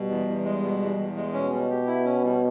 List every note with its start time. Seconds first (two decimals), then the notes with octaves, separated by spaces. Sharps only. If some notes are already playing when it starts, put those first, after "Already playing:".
Already playing: B2 G3
0.09 E2
0.27 E2
0.44 G#3
0.63 B2
0.81 E2
0.98 E2
1.16 G#3
1.33 B2 C#4
1.51 G3
1.70 G4
1.87 E4
2.05 C#4
2.24 G3